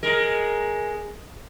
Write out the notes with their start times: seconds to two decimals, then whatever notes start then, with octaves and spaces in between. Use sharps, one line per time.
0.03 G#3 A#4